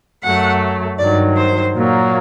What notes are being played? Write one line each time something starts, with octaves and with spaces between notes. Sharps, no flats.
F#2 F#3 A3 F#5
G2 D#3 F#3 D5
C5
A#2 F#3 A#3